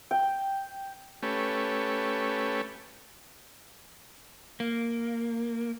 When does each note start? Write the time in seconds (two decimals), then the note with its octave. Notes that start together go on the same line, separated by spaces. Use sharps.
0.11 G5
1.22 A3 C#4 G4 B4
4.60 A#3